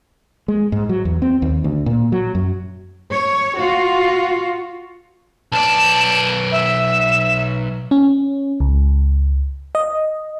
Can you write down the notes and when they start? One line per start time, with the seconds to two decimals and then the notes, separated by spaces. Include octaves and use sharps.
0.48 G#3
0.72 G#2
0.89 F#3
1.05 E2
1.22 C4
1.42 D#2
1.64 D2
1.86 A#2
2.12 F#3
2.35 F#2
3.10 C#5
3.58 F4 F#4
5.52 B1 D5 A5
6.52 E5
7.91 C#4
8.60 C#2
9.75 D#5